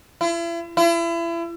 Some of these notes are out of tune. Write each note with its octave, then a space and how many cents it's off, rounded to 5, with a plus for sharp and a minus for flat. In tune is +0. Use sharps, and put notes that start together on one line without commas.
E4 +40
E4 +35